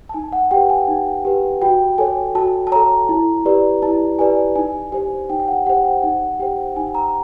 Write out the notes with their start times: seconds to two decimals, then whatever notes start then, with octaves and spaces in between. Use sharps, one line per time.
0.09 A5
0.14 D#4 G#5
0.33 F#5
0.51 G4 B4 G5
0.70 G#5
0.88 D#4
1.25 G4 B4
1.62 F#4 G5
1.98 A4 C#5 G#5
2.35 F#4 A5
2.67 A5
2.72 A4 C#5 A#5
3.09 E4
3.45 G4 B4 D5
3.82 E4 A5
4.19 G4 B4 D5 G#5
4.55 D#4 G#5
4.92 G4 C5 G#5
5.29 D#4 G5
5.40 G5
5.48 F#5
5.66 G4 C5 F#5
5.85 G5
6.03 D#4 F#5
6.39 G4 C5 G5
6.76 D#4 G#5
6.95 A#5